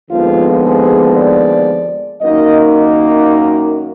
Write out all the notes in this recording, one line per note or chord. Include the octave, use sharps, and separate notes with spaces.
D#2 D3 F3 G#3 B3 F4
G#4
D5
F#2 D#3 A#3 D#4 D#5
D#5